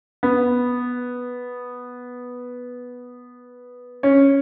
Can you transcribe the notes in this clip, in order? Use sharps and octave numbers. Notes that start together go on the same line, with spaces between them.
B3
C#4